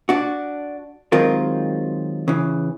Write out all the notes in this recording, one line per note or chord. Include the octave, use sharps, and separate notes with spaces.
D4 F#4
D#3 F#3 G#3 C4 F4 A#4
C#3 E3